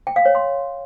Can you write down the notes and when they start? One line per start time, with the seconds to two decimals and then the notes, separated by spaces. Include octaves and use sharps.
0.07 G5
0.16 F5
0.25 C#5
0.35 C6